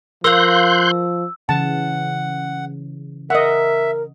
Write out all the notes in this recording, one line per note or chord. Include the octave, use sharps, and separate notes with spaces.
F3 A#4 F5 C6 E6 F#6 G6
C#3 E3 F#5 A5
A#4 D#5 E5 F#5